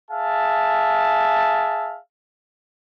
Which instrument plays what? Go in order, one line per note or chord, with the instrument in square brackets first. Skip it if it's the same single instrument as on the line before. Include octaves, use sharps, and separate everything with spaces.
[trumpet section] G#4 E5 F5 A5